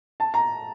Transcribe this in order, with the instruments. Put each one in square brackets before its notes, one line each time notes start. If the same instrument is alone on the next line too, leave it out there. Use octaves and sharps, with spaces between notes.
[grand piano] A5
A#5